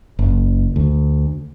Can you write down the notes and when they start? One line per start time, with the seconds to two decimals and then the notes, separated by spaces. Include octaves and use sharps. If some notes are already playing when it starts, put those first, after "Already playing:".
0.19 F#1
0.76 D2